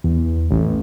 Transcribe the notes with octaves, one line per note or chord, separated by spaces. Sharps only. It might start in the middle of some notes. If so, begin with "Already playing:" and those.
E2
A1